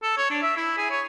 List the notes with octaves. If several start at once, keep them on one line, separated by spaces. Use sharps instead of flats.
A4
C#5
D4
E5
E4
G#4
C#5